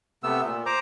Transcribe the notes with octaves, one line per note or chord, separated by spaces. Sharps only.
C3 A3 B3 E6
A#2
C5 A#5 D6